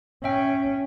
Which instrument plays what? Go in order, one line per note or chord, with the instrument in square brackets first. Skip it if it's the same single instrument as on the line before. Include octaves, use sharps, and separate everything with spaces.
[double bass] C#4 [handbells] E5 G5